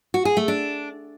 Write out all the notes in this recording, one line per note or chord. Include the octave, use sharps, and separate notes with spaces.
F#4
G#4
A3
D4